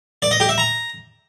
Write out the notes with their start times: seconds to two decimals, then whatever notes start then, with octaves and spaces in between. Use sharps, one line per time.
0.22 D5
0.31 D#5
0.40 G4
0.49 E5
0.58 A#5